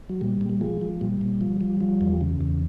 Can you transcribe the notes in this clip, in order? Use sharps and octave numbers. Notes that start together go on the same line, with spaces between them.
F#3
A#2 G3
A#2
G3
F3 G#3
F3
A#2 G3
A#2
F3
F3
F3
E2
C#3
E2